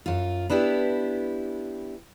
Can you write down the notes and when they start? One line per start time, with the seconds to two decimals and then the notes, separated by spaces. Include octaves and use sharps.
0.06 F#2 F4
0.50 B3 D4 E4 G4